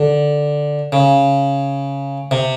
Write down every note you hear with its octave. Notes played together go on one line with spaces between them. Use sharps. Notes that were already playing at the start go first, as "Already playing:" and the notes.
Already playing: D3
C#3
C3